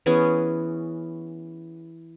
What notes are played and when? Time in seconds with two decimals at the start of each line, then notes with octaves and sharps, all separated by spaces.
0.06 E3 B3 C#4 G#4